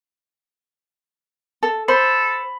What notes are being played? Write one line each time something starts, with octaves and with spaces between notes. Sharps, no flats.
A4
A4 C5 B5